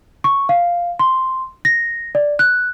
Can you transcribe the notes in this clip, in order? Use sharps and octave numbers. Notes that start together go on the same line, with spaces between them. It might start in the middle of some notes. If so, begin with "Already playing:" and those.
C#6
F5
C6
A#6
D5
F#6